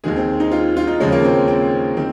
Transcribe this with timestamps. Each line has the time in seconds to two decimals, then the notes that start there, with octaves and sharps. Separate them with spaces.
0.04 D#2 D#3 G#3 G#4
0.16 C4
0.40 D#4
0.52 F4
0.77 F4
0.87 D#4
1.00 D#2 C#3 F3 G#3 C#4
1.12 A#3
1.24 C4
1.48 C4
1.97 D#3 C4